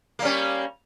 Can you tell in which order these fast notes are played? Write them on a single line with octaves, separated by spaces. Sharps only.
A#3 G3 C#4